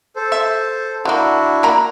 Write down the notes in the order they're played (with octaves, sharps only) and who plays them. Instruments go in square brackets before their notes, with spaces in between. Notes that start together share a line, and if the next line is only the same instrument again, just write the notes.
[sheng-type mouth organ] A4 C5
[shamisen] E5
[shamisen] D3 A#3 [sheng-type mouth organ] D4 E4 F#4
[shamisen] A#3 A#5 B5